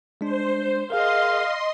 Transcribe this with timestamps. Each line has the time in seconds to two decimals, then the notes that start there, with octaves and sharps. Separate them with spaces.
0.21 G#3 D4 C5
0.90 G#4 A#4 D#5 F5 C6